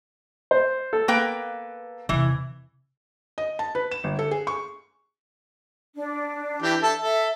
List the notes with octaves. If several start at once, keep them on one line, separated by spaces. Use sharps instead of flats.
C5
A4
A#3 B4 G5
E2 C3 E3
D#5
A5
B4
E7
G1
A4
G#4
C#6
D4
E3 G4 G5
A4 E5 A5
A4 E5